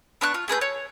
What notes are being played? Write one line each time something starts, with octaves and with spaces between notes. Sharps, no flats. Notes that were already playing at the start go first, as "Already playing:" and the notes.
B3 D4 C#6 F#6
F4
A3 G#4 B4 G6
C#5